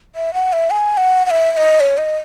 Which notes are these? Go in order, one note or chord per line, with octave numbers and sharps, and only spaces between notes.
E5
F#5
E5
G#5
F#5
F#5
E5
E5
D#5
C#5
D#5